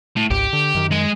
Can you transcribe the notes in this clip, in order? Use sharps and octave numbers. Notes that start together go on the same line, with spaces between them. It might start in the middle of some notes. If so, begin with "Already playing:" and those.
A2
G#1 C#2 G#2 G4
D3
F#2 D#3
G#3 G#5